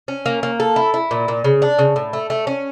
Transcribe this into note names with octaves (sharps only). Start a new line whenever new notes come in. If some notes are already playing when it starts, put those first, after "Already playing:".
C#4
A#3
A#3
A4
E4
E4
A#2
A#2
C#3
D4
C#3
A2
A3
A3
C#4